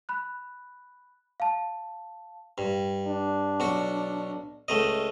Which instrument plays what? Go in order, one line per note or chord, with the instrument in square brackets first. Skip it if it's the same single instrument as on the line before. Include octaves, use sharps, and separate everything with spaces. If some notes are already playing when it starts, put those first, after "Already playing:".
[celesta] B5 F#6
F5 A5
[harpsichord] G2
[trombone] D4
[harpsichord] B1 F#4
C#2 A3 D#5